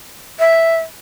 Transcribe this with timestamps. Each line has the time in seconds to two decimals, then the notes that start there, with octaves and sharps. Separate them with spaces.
0.39 E5